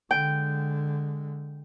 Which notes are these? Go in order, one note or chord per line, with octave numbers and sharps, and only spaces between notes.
D3 G#3 G5